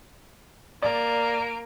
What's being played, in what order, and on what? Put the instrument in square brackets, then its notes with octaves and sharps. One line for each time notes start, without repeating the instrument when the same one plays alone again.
[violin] A#3 D7 [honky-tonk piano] D5